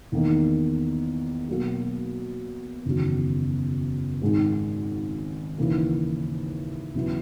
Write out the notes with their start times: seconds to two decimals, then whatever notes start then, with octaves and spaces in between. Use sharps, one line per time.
0.12 E2 D#3 A#3 D#4
1.48 B2 F#3 A#3
2.85 F#1 E2 D#3 F#3
4.22 G#1 G#2 D#3 G#3
5.58 D#2 C#3 E3 A#3
6.95 E2 C#3 F#3 B3 E4